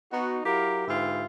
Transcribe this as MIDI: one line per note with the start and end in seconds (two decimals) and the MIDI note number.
0.13 0.40 59
0.13 0.40 63
0.13 0.40 66
0.46 0.83 54
0.46 0.83 64
0.46 0.83 67
0.46 0.83 70
0.46 0.83 77
0.46 0.83 82
0.88 1.26 44
0.88 1.26 50
0.88 1.26 65
0.88 1.26 67
0.88 1.26 71
0.88 1.26 76